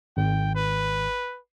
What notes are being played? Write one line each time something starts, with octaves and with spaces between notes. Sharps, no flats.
G#1 G5
B4